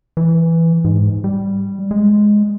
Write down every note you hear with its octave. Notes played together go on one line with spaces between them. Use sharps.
E3
G#2
G3
G#3